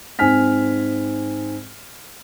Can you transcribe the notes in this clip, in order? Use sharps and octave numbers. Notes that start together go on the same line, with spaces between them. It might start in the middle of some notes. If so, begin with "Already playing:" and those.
G#2 C4 G#5 F6 B6